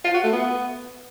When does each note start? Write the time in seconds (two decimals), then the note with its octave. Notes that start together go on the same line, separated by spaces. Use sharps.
0.05 F4
0.14 F#4
0.23 A3
0.32 B3